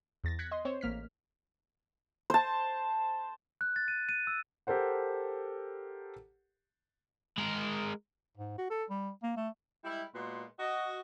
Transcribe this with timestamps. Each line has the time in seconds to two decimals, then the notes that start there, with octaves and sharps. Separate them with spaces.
0.24 E2 A6 A#6
0.39 F#6 G#6 A#6 B6 C#7
0.51 D#5 C6
0.65 C4 C5 C#5
0.81 A1 A#3 F6 B6
2.30 C5 A5
3.61 F#6
3.76 A6
3.88 D#7
4.09 D#7
4.27 E6
4.67 G4 A4 A#4 C5 F#5
7.38 G#3 A#4
8.37 G#2
8.58 F#4
8.70 A4
8.90 G3
9.23 A#3
9.37 A3
9.85 G3 G#3 E4
10.15 A#2 G#3 B3 F#4 C6
10.59 F#4 D#5